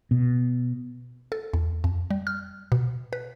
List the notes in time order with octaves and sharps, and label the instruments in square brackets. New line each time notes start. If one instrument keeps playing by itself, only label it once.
[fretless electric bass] B2
[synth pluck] A4
E2
F2
G3
F6
B2
B4